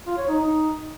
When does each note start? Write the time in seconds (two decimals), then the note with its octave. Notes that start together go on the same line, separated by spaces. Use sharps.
0.07 F4
0.18 C#5
0.28 D#4
0.39 D#4